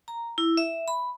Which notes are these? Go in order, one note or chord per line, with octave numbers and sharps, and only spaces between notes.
A#5
E4
E5
B5